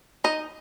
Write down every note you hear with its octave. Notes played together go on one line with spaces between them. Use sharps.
D#4 D#5